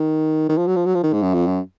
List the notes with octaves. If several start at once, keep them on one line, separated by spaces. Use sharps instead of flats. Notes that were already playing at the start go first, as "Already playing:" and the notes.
Already playing: D#3
D#3
F3
F#3
F3
F#3
F3
D#3
G#2
F#2
F2
F#2